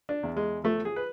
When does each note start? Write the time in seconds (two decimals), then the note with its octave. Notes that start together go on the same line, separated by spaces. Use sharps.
0.09 D4
0.23 E2
0.37 G#3
0.64 F3 A3
0.85 G#4
0.96 B4